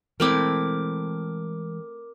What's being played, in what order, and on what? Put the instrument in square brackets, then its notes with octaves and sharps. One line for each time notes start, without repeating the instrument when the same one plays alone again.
[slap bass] E3 G#3 [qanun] A3 C4 E4 [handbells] A#4 D6